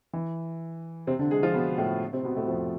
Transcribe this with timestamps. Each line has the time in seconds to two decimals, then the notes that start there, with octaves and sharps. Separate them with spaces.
0.13 E3
1.07 C3 C4
1.19 D3 D4
1.31 G#3 G#4
1.43 F3 F4
1.54 B2 B3
1.78 A2 A3
2.13 C3 C4
2.24 B2 B3
2.37 A2 A3
2.48 F2 F3